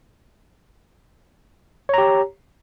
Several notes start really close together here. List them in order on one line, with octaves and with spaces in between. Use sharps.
C#5 A#5 G4